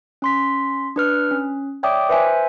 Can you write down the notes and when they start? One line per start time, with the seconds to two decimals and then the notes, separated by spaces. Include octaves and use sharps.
0.22 C#4 C6 B6
0.96 D4 B4 F6
1.31 C#4
1.83 C#5 D5 E5 G5 D6 D#6
2.09 B4 C5 E5 G#5